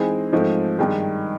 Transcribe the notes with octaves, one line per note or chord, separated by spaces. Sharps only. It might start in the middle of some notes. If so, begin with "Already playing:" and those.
Already playing: E3 G#3 C4 D#4 G#4
G#2 F3 A3 C4 D#4
G2 D#3 G#3